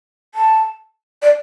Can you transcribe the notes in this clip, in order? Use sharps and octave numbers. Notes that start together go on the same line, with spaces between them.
A5
D5